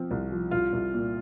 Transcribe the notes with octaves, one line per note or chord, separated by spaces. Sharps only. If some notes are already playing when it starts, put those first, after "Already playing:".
Already playing: F3 C4
C2
F3
C2 F4
C2
A#2